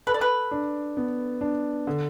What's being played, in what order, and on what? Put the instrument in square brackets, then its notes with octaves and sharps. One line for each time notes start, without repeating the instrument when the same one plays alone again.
[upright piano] A4 [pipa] B4
[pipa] D5
B4
[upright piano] D4
B3
D4
D3